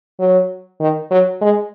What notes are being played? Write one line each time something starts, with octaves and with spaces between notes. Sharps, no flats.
F#3
D#3
F#3
G#3